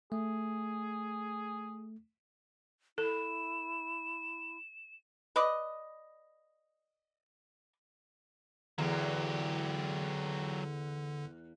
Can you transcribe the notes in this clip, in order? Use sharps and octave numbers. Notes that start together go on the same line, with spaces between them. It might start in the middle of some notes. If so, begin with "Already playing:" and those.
A3 G#4
E4 A4 E7
B4 D5 D#5
E2 D3 F#3 G4